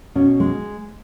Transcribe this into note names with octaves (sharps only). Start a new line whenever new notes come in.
B2 C#4
G#3